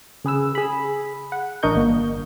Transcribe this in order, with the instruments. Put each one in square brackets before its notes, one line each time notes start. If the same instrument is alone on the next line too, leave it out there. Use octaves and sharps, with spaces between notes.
[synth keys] C#3 G#4 B4 E6
G#4 B5
F#5
A1 D4 A#4 D#5 C#6 G6
G1 A#3